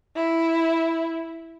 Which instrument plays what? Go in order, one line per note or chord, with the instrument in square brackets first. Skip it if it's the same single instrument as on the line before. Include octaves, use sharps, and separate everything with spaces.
[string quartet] E4